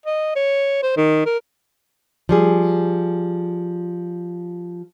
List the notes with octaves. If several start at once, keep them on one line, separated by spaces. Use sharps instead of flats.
D#5
C#5
C5
D#3
A#4
F3 G3 G#4